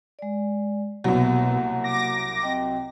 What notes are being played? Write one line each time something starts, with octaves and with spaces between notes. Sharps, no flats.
G#3 D5
C2 B2 F#3 A#3 F#5
D6 A#6
C4 D#5 G5